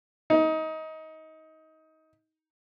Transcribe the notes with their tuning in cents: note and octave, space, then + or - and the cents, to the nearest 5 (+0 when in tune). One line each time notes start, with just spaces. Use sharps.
D#4 +25